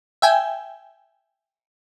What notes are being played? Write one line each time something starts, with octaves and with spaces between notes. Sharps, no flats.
E5 G5 G#5